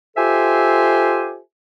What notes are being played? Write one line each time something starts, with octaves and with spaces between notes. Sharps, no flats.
F4 G4 A4 C5 E5 G#5